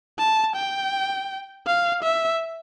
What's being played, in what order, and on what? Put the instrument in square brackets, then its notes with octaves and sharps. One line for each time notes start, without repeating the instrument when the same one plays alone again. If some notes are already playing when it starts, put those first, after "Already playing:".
[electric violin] A5
G5
F5
E5